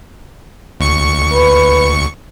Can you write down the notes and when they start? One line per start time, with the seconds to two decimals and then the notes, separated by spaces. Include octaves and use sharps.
0.80 D2 C#6 C#7
1.33 B4